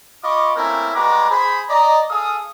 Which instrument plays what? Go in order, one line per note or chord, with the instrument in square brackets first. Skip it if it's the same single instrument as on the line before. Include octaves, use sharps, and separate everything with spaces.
[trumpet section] F4 D#5 B5 C#6 D6
A3 A#3 C4 C#4 E4 A#4
G3 G#3 F#4 B4 A#5 D6
G#4 C5 B5
D5 D#5 A#5
G#4 A4 F5 D#6